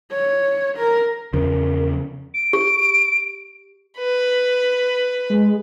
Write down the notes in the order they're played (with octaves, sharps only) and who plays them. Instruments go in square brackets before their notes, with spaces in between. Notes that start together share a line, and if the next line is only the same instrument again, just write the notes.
[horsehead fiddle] C#5
A#4
[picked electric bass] E2 F3 [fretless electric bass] C#3 [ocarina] A#4
[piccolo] D7
[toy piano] G4
[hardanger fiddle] B4
[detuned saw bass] G#3